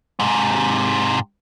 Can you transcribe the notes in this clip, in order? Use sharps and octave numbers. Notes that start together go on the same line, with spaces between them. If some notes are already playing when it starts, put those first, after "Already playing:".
G#2 C3